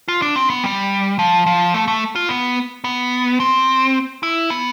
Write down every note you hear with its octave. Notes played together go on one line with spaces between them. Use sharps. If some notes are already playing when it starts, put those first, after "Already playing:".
F4
D4
C4
B3
G3
F3
F3
A3
A3
F4
B3
B3
C4
E4
B3